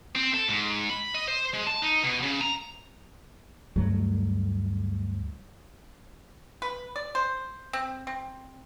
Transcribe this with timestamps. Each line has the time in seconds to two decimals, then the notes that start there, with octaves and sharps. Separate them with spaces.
0.15 C4
0.34 A4
0.48 G#2
0.90 B5
1.15 D#5
1.28 C5
1.54 G#3
1.67 A5
1.83 D#4
2.04 B2
2.23 C#3
2.41 A#5
3.76 D2 G2 F#3 A3
6.62 B4
6.96 D5
7.15 C5
7.73 C4
8.07 C4